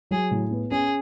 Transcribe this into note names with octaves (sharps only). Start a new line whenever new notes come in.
F#3 G#4
A2
B3
C#4 G#4